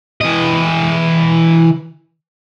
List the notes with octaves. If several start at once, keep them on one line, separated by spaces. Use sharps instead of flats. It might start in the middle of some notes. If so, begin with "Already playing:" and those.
E3 D#5